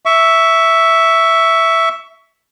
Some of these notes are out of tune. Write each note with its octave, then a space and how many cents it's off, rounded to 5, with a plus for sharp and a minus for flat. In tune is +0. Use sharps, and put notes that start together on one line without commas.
E5 +0 C#6 +20